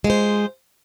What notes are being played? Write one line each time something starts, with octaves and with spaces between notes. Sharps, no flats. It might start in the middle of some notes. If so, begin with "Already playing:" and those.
G#3 F4 C5